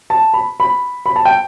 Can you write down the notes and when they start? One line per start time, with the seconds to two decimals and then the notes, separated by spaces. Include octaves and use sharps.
0.10 A5
0.34 B5
0.60 B5
1.06 B5
1.16 A5
1.25 G5